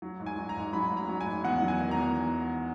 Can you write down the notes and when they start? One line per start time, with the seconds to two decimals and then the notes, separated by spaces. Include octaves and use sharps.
0.02 F#3
0.20 G#2
0.26 G#5
0.37 F#3
0.49 A#5
0.56 G#2
0.73 F#3 B5
0.91 G#2
0.97 A#5
1.09 F#3
1.21 G#5
1.26 G#2
1.44 E2 F#5
1.62 F#3
1.68 G#5
1.80 D#3
1.91 A#5
1.96 E2